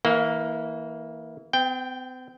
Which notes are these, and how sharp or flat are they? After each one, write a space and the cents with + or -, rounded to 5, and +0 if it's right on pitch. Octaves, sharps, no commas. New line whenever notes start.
E3 -20 A#3 +0 F5 +30
C4 -45 G5 +0